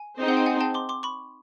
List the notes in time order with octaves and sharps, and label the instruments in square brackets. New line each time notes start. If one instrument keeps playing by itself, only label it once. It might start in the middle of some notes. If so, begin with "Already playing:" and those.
Already playing: [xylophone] G#5
[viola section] C4 D#4 G#4 C5
[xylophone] F#5
G5
F#5 G#5
G5 A5
C6 D6
C6 D6
B5 C#6